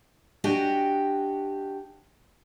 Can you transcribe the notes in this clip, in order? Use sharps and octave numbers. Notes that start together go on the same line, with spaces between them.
D4 F#4 G4 D#5 G5 G#5